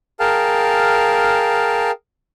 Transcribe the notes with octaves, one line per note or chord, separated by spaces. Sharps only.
G#4 A#4 F5 G5 A5 F6